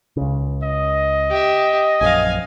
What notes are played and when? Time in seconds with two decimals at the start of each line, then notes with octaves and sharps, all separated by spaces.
0.17 C#2 C#3
0.63 D#5
1.30 G4 E5
2.01 A#1 F#2 F5 G#5